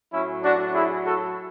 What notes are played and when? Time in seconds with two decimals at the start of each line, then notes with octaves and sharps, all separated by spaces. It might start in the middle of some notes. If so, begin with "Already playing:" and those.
0.12 A2 F#3 C#4 E4
0.43 D4 F#4
0.74 E4 G#4
1.04 F#4 A4